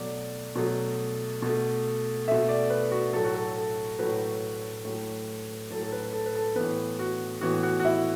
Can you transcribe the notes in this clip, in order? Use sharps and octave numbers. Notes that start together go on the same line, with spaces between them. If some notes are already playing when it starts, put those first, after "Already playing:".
Already playing: B2 F#3 A3 D5
B2 F#3 A3
B2 A3
B2 A3 E5
D5
B4
F#4
A2 F#3 A3 A4
F#4
A4
A4
A2 F#3 A3 B4
A2 F#3 A3
A2 F#3 A3 A4
A4
B4
A4
B4
A4
A2 E3 B3 B4
F#4
A2 E3 B3 F#4
F#4
F#4
E4